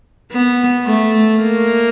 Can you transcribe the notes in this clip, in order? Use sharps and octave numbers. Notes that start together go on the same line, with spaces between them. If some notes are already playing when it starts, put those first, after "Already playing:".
B3
A3
A#3